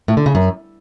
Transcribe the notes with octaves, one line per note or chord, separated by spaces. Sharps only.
A2
D3
C#3
F#2